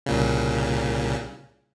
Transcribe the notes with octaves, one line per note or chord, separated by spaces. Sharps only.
C2 A#2 C#3